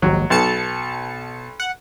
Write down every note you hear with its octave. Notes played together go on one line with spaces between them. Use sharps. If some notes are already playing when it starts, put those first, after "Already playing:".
A#1 D#2 G#2 F#3
B1 B2 A5 C#7
F#5